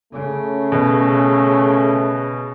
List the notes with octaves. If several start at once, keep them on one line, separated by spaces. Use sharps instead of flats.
C#3 A3 C#4
B2